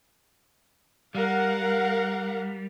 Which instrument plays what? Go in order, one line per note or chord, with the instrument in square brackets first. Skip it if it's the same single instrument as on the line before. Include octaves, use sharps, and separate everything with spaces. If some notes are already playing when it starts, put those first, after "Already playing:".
[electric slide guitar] G3 [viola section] A#4 F5 F#5